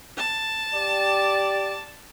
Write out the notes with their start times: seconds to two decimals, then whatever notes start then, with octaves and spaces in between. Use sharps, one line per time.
0.17 A5
0.74 G4 D5